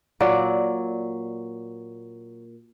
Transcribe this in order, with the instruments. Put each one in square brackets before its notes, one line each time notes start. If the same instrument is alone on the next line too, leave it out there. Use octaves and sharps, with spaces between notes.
[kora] A#2 F#3 D5 F#5